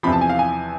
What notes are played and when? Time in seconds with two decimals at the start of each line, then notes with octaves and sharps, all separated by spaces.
0.03 E2 C3 F3 B5
0.12 A5
0.21 G#5
0.30 F5
0.39 G#5